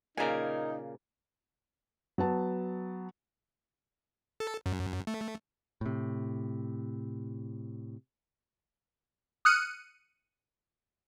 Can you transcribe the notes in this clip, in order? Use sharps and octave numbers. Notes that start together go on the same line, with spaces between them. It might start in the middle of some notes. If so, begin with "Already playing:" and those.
A#2 C#3 A#3 D#4 A#4 G#5
F#3 B3 A5
A4
F#2
A3
A2 C3
D#6 F6 F#6 C#7 D#7